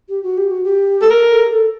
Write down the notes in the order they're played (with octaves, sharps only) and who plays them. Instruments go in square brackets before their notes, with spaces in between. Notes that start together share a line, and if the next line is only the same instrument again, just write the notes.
[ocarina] G4
F#4
G4
F#4
G4
[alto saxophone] A4
A#4
[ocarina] A4
G#4
A4